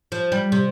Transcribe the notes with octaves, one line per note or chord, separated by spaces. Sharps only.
F3
G3
C3